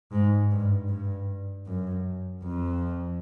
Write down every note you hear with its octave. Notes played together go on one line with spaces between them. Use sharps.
G#2
G2
G2
F#2
F2